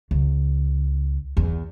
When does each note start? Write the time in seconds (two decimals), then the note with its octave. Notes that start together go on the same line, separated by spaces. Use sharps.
0.11 C#2
1.37 E2